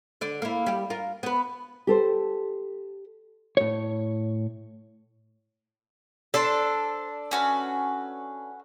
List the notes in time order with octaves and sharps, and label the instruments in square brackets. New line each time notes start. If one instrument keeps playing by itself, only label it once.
[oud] D3 D5
A#3 E4
G3 G4
F4 A#4
B3 B4
[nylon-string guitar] G4 A4 C5
[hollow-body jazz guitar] A2 C#5
[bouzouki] D4 A4 [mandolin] C5 A5 C6
[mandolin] C#4 F#4 B4